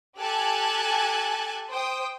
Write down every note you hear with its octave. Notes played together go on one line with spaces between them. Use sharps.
G4 A4 G#5 A5 F#6 G#6
C5 G5 D#6